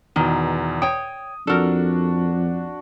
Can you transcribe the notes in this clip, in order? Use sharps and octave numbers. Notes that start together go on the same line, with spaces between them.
E2 B2 D#3
C#5 G5 D#6
F2 D4 F#4 A4 A#4